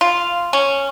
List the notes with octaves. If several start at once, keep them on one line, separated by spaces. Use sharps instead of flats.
F4
C#4